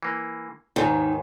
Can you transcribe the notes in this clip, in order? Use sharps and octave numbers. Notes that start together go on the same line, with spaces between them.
E3 A#3
D#2 G#2 D#3